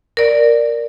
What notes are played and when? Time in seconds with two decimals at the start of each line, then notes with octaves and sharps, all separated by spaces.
0.17 A#4 D5